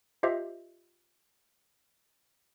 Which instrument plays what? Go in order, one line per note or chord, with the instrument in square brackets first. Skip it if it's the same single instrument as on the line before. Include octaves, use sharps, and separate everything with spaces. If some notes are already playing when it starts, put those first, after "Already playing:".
[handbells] F4 G4 C5 D#5 E5